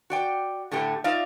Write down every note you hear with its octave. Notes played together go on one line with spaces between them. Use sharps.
F#4 D5 G5
A2 D3 A3 G4
D#4 F4 D5 E5 F5